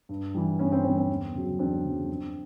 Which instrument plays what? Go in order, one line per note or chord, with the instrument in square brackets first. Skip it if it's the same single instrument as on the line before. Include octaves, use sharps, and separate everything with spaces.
[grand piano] G2
E3 G3
G2 B3 C#4
C4
E3 G3 C4
C4
E2
C#3 F#3
E2 C4 D4
C#3 F#3
F2